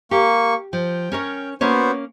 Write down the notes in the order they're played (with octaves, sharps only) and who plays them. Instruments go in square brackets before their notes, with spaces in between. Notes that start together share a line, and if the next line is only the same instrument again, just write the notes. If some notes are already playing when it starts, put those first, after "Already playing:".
[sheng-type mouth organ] A#3 C#6 [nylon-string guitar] G4
[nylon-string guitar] F3 [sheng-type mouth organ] G5
[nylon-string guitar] C#4 A#4 C#5
[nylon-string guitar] A#3 C#4 C#5 [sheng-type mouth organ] B3 F#4 C5